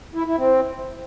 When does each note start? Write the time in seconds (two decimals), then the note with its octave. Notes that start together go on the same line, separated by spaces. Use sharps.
0.14 E4
0.26 E4
0.37 C4